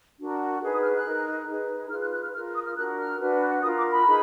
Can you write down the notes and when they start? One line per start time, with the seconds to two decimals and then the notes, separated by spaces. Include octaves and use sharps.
0.18 D4 F#4 A#4
0.61 D#4 G#4 B4
0.72 D#6
0.82 F6
0.94 F#6
1.05 D#4 A#4
1.47 D#4 G#4 B4
1.90 F4 G#4 B4 F6
2.01 F#6
2.12 F#6
2.22 F6
2.33 F4 A#4 F6
2.55 D#6
2.66 F6
2.76 D4 F#4 A#4 F#6
2.97 F6
3.19 D4 F#4 B4
3.62 F4 A#4 D#6
3.77 D6
3.90 B5
4.06 D#4 G#4 B4